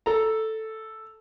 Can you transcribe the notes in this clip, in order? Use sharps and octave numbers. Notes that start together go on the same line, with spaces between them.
A4 A#5